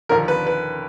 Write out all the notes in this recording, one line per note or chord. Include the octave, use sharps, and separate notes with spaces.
D#2 D3 F3 A#4
B4
B4